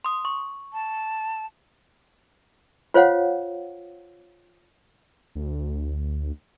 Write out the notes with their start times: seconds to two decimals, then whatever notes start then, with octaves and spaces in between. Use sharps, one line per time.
0.05 C6 D#6
0.25 C#6
0.73 A5
2.94 F4 C5 C#5 F5 F#5
5.35 D2